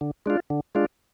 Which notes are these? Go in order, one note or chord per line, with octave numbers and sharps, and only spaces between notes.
D3
G#3 D4 F4
D3
G#3 D4 F4